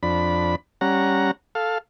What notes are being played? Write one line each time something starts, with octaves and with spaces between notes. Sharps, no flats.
F2 D4 B5
G3 C#4 F#5 A#5
A4 F5